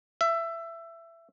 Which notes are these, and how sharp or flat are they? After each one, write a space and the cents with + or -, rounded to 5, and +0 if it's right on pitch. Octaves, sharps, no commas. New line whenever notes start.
E5 +20